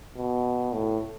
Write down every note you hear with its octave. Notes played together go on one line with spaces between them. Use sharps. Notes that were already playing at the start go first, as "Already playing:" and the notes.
B2
A2